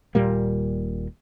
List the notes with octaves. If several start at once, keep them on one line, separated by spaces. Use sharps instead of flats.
D#1 A#2 G3 A#3